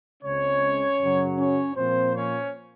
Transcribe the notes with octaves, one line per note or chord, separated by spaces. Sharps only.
C#2 C#3 G#3 C4 C#4 C#5
F#2 C#3 F#3
C#4 C#5
A#2 F3 A#3 C4 C5
C#4 C#5